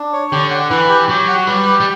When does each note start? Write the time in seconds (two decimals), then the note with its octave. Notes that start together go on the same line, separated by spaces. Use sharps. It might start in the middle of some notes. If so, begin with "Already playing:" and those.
Already playing: D4
0.13 C#5
0.32 D3 G4
0.51 F#5
0.70 E3 B4
0.89 G4
1.09 F#3 G4
1.28 F#5
1.47 G3 B4
1.66 G4
1.80 G3